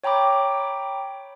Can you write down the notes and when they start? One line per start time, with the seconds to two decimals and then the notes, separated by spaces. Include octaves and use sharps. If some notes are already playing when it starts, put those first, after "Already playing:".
0.04 C#5 G5 A#5 B5 D6